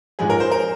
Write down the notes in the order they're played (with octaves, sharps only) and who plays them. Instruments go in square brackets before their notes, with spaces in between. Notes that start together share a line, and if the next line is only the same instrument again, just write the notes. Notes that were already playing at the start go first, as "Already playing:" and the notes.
[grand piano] G#2 F3 G#3 G#4
A#4
C5
A#4